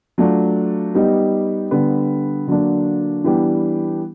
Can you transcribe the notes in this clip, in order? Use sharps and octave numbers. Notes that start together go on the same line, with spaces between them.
F#3 A3 D4 F4
G3 B3 D#4 G4
D3 G3 B3
D3 F#3 A#3 D4
E3 G3 B3 D4 G4